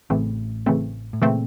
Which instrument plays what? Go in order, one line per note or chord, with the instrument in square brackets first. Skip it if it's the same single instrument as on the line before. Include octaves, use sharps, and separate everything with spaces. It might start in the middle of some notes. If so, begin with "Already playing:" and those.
[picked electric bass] A1 A2 [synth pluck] C#3 E3 A3 C4
[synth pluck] C#3 E3 A3 C4
[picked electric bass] A2
[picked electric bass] A#2 [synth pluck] C#3 E3 A3 C4